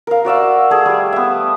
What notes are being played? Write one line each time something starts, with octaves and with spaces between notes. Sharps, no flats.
A#4 F5
F#4 D5 E5 F5
A3 G#4
G3
B3 E5